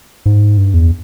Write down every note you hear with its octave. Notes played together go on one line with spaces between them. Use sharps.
G#2
G2
E2